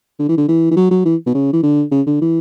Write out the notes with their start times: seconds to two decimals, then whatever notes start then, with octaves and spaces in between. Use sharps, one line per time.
0.19 D3
0.29 E3
0.37 D3
0.48 E3
0.71 E3
0.77 F#3
0.91 F#3
1.05 E3
1.27 B2
1.34 C#3
1.53 E3
1.63 D3
1.92 C#3
2.07 D3
2.21 E3